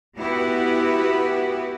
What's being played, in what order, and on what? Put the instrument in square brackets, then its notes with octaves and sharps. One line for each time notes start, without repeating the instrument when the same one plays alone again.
[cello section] B3 E4 F#4 G4 B4